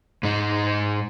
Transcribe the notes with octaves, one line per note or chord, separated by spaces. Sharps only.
G#2 D#4